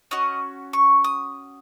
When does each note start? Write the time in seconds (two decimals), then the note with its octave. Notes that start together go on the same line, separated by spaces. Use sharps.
0.11 C#4 F#4 D#5
0.73 C#6
1.04 D#6